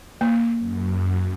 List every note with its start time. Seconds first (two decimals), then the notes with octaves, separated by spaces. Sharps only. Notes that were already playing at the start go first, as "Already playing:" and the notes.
0.21 A#3
0.58 F#2